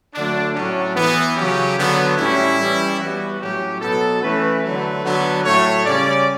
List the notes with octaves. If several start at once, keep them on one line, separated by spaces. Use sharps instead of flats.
D3 F#3 A3 D4
A2 F#3 C#4 D4
E3 B3
C#3 F#3 C#4 G4
D3 F#3 B3
A2 G3 C#4 E4
E3 G3 C#4
E3 G3 B3 F#4
A2 F#3 C#4 G4
B2 F#3 B3 A4
E3 A3 C#4 B4
D3 F#3 A3 B4
D3 F#3 B3
A2 F#3 A3 C#5
C#3 G3 C#4 D5